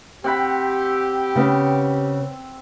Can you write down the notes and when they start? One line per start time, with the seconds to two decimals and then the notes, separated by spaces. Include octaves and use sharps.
0.24 C4 G4 F#5 B5
1.35 C#3 B3